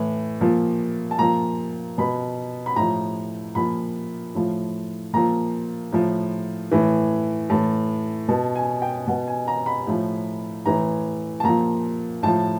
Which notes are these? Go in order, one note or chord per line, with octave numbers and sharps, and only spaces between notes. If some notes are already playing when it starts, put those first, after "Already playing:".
Already playing: A2 E3
A#2 F3
A5
A#2 F3 A#5
B2 B5
B5
A2 F3 A#5
A#2 F3 B5
A2 F3
A#2 F3 A#5
A2 F3
A2 E3
A2 E3 A5
B2 A5
G#5
G5
B2 F#5
G#5
A#5
B5
A2 F3
A2 E3 A#5
A5
A#2 F3 A#5
A2 F3 A5